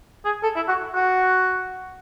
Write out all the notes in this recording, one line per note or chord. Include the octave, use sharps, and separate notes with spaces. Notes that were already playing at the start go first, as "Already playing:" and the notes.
G#4
A4
E4
F#4
F#4